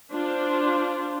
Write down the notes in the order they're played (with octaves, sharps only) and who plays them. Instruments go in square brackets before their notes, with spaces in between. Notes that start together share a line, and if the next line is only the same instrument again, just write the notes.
[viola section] D4 F4 C5